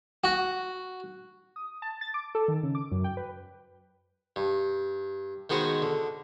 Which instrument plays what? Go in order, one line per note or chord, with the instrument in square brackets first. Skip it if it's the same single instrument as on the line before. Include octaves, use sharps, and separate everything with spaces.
[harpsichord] F#4
[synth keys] D#6
A5
A6
D6
A4
D#3
C#3
D6
F#2
G5
B4
[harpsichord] G2
D#3 G#3 B3 F#4 G#4 C5
D3